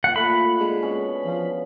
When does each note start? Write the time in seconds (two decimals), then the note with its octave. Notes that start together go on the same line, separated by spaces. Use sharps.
0.04 A#2 F#5
0.16 A3 B5
0.60 D3 G#3
0.82 B2 C#4
1.26 F3